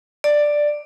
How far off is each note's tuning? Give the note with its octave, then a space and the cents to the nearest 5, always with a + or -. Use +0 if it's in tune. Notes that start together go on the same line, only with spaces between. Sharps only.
D5 +5